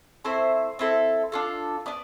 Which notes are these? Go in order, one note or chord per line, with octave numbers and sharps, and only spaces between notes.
A3 C4 E4 C5
C4 E4 A4
D4 F4 A4
B3 D4 D5